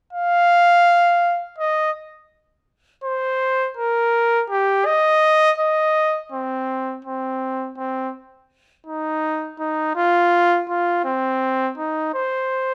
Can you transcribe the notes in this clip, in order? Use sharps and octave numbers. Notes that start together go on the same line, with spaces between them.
F5
D#5
C5
A#4
G4
D#5
D#5
C4
C4
C4
D#4
D#4
F4
F4
C4
D#4
C5